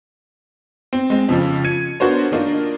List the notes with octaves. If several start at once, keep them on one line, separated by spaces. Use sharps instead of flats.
C4
G#3 C4
F2 C#3 F3
G#6 C#7 D#7
B3 D4 F#4 A#4 C5 C#5
D#3 A#3 D4 D#4 F4 A#4